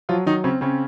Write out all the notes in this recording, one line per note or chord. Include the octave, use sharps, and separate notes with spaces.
F3 F#3 F4
D#3 F#3 D#4
C#3 C4 C#4
C#3 C4 C#4